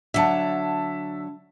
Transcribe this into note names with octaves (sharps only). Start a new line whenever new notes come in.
D3 F#3 E5 A5